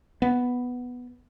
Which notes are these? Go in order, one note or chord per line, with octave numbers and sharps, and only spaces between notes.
B3